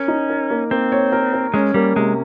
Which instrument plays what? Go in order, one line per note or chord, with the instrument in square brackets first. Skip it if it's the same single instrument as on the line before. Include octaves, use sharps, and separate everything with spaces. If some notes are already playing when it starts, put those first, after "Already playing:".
Already playing: [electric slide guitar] C#4 [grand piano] A#4
[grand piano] D#4
A#4
A#3
[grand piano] A#3 [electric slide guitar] C4
[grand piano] C#5
A#4
A#4
[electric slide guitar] G#3 [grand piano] C#4
[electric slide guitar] G3 [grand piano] A#3
[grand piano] C3 [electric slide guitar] G#3